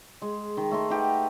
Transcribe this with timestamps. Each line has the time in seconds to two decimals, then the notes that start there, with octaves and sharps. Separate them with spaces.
0.22 G#3
0.57 D#3 A#4
0.71 A3 D#5 C6
0.90 D#4 G4 B4 F#5